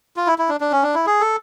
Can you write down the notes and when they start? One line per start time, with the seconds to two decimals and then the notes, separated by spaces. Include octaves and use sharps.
0.16 F4
0.27 E4
0.38 E4
0.49 D4
0.61 D4
0.72 C#4
0.83 D4
0.94 E4
1.06 G#4
1.21 A4